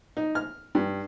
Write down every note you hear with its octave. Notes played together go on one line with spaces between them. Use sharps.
D#4
F6
G2